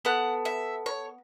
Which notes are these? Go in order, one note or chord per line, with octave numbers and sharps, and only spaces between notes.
B3 A4 F#5
E5
C#5